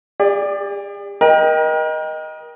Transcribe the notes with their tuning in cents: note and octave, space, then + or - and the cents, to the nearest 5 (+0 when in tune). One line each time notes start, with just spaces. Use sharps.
G4 +45 D5 +0
A#4 +35 D#5 +0 G5 +0